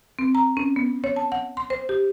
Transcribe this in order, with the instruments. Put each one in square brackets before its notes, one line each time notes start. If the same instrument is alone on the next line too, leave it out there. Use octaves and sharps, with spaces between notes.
[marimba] C4
A#5
C#4
B3
C#5
A5
F#5
C6
C5
G4